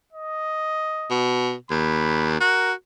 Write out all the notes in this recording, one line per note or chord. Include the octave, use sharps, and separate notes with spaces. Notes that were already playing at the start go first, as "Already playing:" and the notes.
D#5
B2
D#2 B5
F#4 A#4